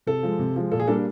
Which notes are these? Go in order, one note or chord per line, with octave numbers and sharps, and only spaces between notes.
C3 A4
F3 G#3
C3
F3 G#3
A#2 A4
G#4
G3 A#3 D4 A4